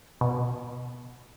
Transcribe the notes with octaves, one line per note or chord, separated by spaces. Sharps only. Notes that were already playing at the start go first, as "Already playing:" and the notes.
B2